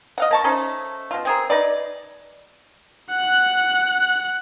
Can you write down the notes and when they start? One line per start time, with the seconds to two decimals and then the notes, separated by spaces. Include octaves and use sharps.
0.18 D#5 F5 F#5
0.31 A#3 A5 C#6
0.44 A3 C#4 D#4 C5
1.11 B2 F4
1.25 C4 G#4 A#4
1.50 D#4 B4 D5
3.11 F#5 F#6